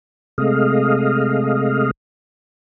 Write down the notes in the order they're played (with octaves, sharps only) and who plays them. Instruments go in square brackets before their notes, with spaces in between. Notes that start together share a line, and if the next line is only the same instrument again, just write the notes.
[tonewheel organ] C3 G#3 A3 D#5 F5